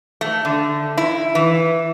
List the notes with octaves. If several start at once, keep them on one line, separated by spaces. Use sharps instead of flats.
A3
D3
E4
E3